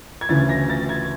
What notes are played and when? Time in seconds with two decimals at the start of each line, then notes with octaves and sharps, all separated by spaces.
0.21 G#6
0.29 D2 C#3 E3 A6
0.49 A#6
0.70 A6
0.89 G#6